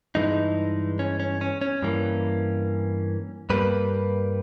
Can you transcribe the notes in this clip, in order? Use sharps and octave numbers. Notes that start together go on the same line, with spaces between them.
G2 E3 G#3 D#4
C#4
C#4
C#4
C#4
G2 E3 A#3
G2 G3 A#3 B4